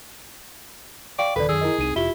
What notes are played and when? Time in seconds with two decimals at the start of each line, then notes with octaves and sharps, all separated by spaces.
1.19 D5 F5 G5 C#6
1.36 D#1 D3 A4 B4 D5
1.49 F#2 D#3 G#4 E6
1.61 E4 A#4 D#5
1.78 C2 C4 D#4 D#7
1.96 F1 E4 F4 G4 G7